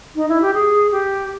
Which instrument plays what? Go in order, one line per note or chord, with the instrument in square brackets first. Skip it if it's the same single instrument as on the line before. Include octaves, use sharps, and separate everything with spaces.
[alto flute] D#4
E4
G4
G#4
G4